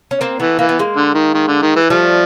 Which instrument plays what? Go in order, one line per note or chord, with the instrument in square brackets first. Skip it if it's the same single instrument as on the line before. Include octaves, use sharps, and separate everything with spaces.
[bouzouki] C#4
A#3 C4
[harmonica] E3 [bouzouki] A3 B3
[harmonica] E3 [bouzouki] A#3
[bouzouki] B3
G#3 A#3
[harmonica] D3
D#3
D#3
D3
D#3
E3
[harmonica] F3 [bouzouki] G3 A3